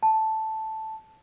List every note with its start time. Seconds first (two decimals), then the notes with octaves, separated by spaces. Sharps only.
0.03 A5